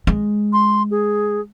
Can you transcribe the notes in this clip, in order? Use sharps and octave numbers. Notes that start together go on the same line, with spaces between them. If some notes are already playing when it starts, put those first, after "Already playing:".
G#3
C6
G#4